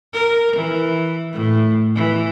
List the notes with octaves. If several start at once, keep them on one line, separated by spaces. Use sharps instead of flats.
A#4
E3
A2
E3